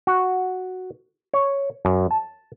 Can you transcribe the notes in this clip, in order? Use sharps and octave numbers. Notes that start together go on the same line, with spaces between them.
F#4
C#5
F#2
A5